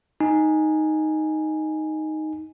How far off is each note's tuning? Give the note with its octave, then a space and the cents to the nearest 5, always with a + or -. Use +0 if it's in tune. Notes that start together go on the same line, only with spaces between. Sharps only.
D#4 +0 G#5 +0